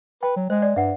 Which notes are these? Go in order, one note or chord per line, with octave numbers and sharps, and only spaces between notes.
B4 G5
F#3
G#3 C5
D5
G2 E5 F#5